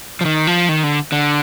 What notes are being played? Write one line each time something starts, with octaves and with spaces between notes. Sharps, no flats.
F3
D#3
F3
D#3
D3
D3